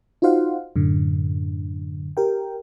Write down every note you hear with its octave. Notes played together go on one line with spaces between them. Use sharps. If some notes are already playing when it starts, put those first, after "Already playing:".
D#4 F4 F#4 C5 F5 F#5
F#2 A2 D3
G4 A#4 G5